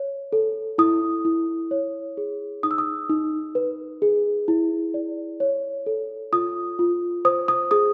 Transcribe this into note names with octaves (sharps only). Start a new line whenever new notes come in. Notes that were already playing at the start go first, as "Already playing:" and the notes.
Already playing: C#5
A4
E4 D#6
E4
C#5
G#4
D#4 D#6
E6
D#6
D#4
B4
G#4
E4
D5
C#5
A4
F4 D#6
F4
C5 D#6
D#6
G#4 D#6